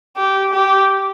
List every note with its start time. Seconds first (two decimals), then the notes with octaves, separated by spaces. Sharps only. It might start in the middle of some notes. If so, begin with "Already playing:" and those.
0.17 G4
0.53 G4